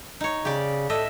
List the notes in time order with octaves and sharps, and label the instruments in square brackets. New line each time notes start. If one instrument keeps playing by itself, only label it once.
[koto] D#4 C#5
[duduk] C#3 [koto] G4 D5
[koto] A2 D#5 E5 [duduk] A4